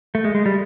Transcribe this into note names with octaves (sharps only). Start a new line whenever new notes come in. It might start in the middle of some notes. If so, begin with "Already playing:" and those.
A3
G#3
G#3
G3